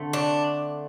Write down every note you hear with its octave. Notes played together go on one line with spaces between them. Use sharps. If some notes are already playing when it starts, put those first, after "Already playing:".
Already playing: D3 A3 C4
D4